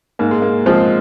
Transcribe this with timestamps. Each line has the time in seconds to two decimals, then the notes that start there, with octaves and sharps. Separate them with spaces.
0.19 G#2 A#3
0.31 G#3
0.42 A#3
0.66 F3 G#3 C4